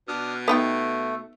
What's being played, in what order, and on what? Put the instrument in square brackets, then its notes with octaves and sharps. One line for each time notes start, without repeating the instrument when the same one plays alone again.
[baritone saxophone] B2 [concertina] D4 D#6 F6
[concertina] A3 [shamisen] B3 D#4 G5